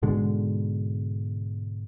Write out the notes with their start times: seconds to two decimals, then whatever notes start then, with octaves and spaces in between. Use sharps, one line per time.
0.02 G#2 B2 D3 G#3